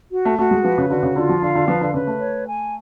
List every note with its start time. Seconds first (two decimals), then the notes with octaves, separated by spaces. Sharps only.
0.12 F#4
0.25 A3
0.39 A3 F#4
0.51 G#3
0.64 F3 B4
0.78 C#3
0.90 D3 F#4
1.03 C#3
1.16 D3 F4
1.29 F3
1.42 D3 F5
1.55 D3
1.68 F3 B4
1.81 D3
1.94 C#3 B4
2.07 A3
2.20 C#5
2.47 G#5